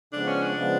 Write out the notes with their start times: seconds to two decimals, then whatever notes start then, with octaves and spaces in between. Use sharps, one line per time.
0.13 C#3 F3 G#3 B3 D4
0.28 C#4
0.43 D4
0.57 C#3 F3 G#3 B3